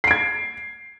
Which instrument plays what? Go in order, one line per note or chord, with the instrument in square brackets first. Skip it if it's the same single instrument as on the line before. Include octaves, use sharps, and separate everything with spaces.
[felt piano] C7
D7
G#6